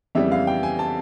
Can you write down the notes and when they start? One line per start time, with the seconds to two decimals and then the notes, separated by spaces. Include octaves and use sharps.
0.15 F2 C#3 E3 G3 B3 E5
0.32 F5
0.47 G5
0.63 G#5
0.79 A5